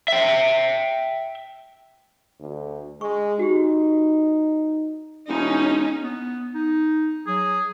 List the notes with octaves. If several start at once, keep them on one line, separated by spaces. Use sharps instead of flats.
E5 G5
D2
G#3 C#6
D#4 F#4 G4
E1 C#4 D#4
B3
D#4
F#3 G#4